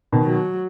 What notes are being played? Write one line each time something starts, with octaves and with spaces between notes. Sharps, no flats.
B2 D#3
F#3